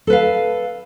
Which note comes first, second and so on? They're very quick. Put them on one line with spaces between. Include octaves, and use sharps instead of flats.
A4 B4 F5 A5